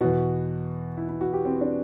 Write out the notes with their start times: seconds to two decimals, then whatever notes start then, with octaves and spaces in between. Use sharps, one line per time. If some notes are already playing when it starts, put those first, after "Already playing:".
0.01 E2 B2 F#4
0.97 E4
1.08 E4
1.21 F#4
1.33 G4
1.45 C4
1.61 D4